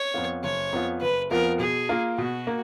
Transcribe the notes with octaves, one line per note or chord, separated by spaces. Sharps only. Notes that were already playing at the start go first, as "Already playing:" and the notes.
Already playing: C#5
F2 F3 B3 F4
F#1 C#5
F2 F3 B3 F4
F#1 B4
F2 F3 B3 F4 A#4
B2 G#4
A#3 F4 A#4
B2 F#4
A#3